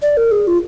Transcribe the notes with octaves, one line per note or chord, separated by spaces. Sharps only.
D5
A#4
G#4
F4